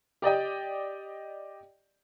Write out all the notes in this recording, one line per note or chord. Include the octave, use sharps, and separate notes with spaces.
G4 D5 D#5 G5